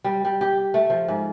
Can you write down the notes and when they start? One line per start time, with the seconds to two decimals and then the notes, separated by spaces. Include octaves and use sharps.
0.04 G3
0.25 G3
0.41 G4
0.74 A3
0.90 F3
1.08 G#2